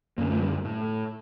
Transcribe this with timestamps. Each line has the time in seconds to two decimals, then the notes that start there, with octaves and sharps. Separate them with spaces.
0.18 F#2 D3 A#3
0.30 A3
0.42 G3
0.65 A2